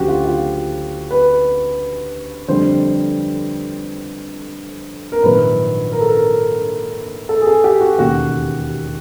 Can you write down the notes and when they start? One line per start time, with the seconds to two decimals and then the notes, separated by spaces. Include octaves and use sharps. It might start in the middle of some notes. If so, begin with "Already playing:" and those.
Already playing: D2 C#3 F#3 F#4 G4
0.08 F4
0.25 F4
1.11 B4
2.48 F2 D3 G3 C5
5.12 A#4
5.23 A#1 G#2 D#3 F#3 B4
5.92 A#4
6.01 A4
6.11 A#4
7.29 A4
7.42 G#4
7.47 A4
7.64 G4
7.81 F#4
7.98 E1 D#2 C#3 F#4